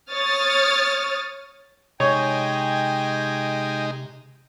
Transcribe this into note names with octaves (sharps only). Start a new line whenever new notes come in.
C#5 D#6 F6 A6
C3 G#3 D#4 C#5 G5 G#5